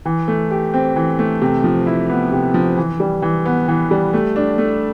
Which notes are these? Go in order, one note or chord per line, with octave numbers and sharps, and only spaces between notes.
E3
A3
G4
C4
E3
A3
C3
F3
E4
B3
C3
F3
E3
G3
E3
B3
E3
G3
A3
D4
A3